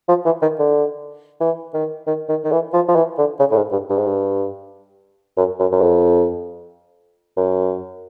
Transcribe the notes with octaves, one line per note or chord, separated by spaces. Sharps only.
F3
E3
D#3
D3
E3
D#3
D#3
D#3
D#3
E3
F3
F3
E3
D3
C#3
A2
G#2
G2
G2
G#2
G2
F#2
F#2
F#2
F2
F#2